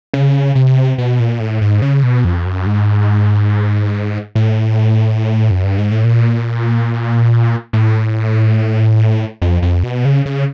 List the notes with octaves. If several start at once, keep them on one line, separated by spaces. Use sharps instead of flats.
C#3
C3
B2
A#2
A2
G#2
C#3
B2
F2
F#2
G#2
A2
F#2
G2
G#2
A2
A#2
A2
F2
F2
B2
C#3
C#3